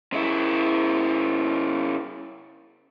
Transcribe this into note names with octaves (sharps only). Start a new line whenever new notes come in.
C#3 E4